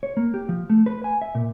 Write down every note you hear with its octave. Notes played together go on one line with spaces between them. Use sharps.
C#5
A#3
G4
F3
A3
B4
G#5
E5
A#2